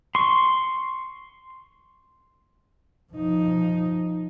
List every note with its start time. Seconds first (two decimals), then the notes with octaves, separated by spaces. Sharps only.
0.15 C6 C#6
3.13 F3 D#4